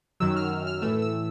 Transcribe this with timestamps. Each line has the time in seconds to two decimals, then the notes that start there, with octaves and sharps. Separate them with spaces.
0.20 F#2 D#3 F#3 E6
0.37 F6
0.67 F6
0.82 A2 E3 A3 E6
1.02 E6